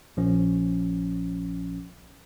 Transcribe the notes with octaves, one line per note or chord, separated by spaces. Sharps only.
A#1 F3 C#4